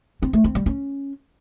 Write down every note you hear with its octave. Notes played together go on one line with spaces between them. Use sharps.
C4
A3
C4
G3
C#4